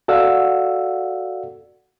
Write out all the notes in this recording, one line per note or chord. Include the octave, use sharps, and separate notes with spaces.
F#4 A4 D5 F5 F#5 E6